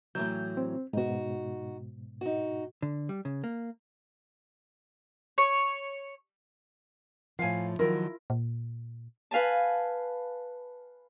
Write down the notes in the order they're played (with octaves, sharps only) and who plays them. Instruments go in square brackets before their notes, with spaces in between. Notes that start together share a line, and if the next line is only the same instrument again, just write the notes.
[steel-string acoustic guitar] A2 E3 F#3 [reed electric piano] G6
[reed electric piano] C4
[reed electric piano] G#2 B2 [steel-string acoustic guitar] D#4 F#4
[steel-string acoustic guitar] D#4 F#4
[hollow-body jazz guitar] D3
G3
C#3
A#3
[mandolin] C#5
[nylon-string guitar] A2 F3 [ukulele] F5 G#5
[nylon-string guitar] D#3 F3 F#3 [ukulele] E4 F4 A#4
[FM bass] A#2
[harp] B4 F5 G#5 A5